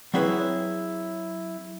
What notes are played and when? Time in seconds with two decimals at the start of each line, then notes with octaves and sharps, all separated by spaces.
0.14 F#3 C4 E4 G#4 B4 C#5